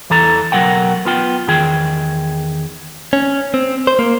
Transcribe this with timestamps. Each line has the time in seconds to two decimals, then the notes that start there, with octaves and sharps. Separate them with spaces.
0.10 E2 E3 A4 A#5
0.52 B1 E3 F#3 A#4 F#5 G5
1.05 B3 F4 G5
1.48 E2 D#3 G#4 G5
3.13 C#4
3.54 C4
3.87 C5
3.99 A#3